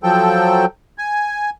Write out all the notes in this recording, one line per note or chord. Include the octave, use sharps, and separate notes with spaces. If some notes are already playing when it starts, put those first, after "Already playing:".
F3 F#3 A4 G5
G#5